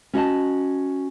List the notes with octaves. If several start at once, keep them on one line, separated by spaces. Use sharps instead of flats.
C#4 F#4 D#5 A5